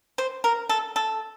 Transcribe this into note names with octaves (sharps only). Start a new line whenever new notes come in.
C5
A#4
A4
A4